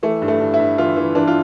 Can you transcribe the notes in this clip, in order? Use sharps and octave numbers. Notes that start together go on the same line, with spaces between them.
E3 A3
G2
A3
G2
E4
G2
E3 F4
E3
E3 D4
F4